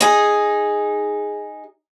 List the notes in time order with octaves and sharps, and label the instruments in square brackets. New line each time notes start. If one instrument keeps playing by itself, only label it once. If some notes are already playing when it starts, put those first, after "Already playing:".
[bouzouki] D#4 G#4